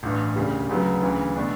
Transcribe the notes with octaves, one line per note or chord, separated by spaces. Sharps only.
A1 G2 E3
E1 D2 C#3 G3
D2 C#3 F#3 B3
D2 C#3 E3
B2 A3 D4